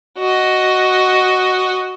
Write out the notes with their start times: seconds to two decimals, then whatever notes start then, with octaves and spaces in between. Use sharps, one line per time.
0.18 F#4 D#5